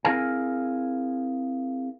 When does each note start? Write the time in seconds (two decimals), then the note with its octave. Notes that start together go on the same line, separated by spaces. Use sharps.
0.05 C4 E4 G#4 A#4 F5 G#5